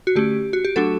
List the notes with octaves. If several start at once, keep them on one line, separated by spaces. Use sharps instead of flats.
F#4
D3 A3 C#4 G4
F#4
G4
F#3 A3 D4 F#4 A4